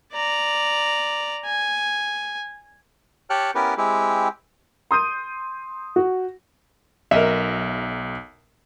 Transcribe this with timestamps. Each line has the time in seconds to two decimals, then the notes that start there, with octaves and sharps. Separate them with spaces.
0.12 D5 A#5
1.46 G#5
3.30 G4 C#5 G5 A5 F6 F#6
3.55 B3 C#4 E4 G4 A#4 B4
3.77 G#3 C4 E4 G4
4.91 C6 D#6 G6 D#7
5.96 F#4
7.11 B1 A#4 D#5 E5